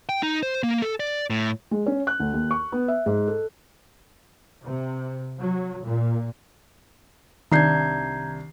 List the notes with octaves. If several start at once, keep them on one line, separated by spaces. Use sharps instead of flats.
G5
D#4
C5
A#3
A4
D5
A2
G#3
C#4
F#6
D2
D#2
C#6
B3
E5
G#2
A4
C3
F#3
A#2
C2 D#3 D4 A#5 G6 G#6 C7